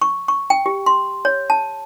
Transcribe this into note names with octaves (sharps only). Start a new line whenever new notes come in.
C#6
C#6
G5
G4
C6
C#5
A5